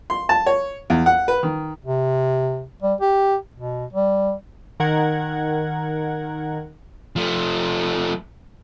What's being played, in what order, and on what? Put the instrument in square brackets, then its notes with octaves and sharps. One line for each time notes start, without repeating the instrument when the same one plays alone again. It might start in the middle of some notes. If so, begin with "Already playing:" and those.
[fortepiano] C6
A5
C#5
E2
F#5
B4
D#3
[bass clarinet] C3
G3
G4
B2
G3
[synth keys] D#3 A#4 F#5 G#6
[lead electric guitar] F3 A3